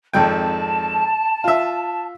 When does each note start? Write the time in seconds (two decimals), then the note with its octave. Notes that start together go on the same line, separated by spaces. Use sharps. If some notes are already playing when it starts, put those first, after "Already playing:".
0.13 G#1 F2 G5 A5
1.44 F4 E5